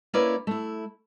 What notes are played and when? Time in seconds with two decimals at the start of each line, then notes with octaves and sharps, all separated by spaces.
0.14 A#3 C#4 E4 B4 C#5 D5
0.47 A3 E4